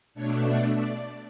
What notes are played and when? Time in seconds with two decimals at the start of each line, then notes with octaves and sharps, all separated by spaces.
0.14 B2 A3 D4 C#5
0.46 E5
0.77 D5